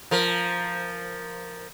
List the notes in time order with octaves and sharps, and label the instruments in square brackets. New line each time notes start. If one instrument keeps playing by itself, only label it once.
[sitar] F3 A#4